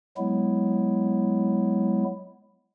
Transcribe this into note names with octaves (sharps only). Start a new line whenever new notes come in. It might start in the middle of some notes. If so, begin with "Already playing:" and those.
F#3 G#3 B3 E4